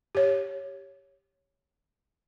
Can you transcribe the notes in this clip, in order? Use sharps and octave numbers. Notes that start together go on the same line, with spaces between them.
G4 C#5